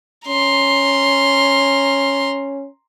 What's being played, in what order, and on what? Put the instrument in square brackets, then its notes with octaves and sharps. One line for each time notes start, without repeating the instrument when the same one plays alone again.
[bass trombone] C#4 [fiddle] A#5 C6